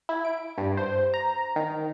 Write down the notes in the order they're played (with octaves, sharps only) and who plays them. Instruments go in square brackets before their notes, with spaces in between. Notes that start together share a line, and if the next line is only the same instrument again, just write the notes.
[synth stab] E4
D7
G2
C5
A#5
D#3